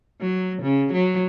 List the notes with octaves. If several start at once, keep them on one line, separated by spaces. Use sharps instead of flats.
F#3
C#3
F#3